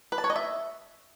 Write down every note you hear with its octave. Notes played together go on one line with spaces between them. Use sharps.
B4
A5
C#5
D#5
E5